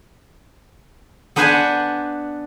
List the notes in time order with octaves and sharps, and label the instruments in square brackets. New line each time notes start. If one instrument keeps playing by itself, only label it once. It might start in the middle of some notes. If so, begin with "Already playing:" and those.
[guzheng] B3 D4 B4 C5 F#5 G#5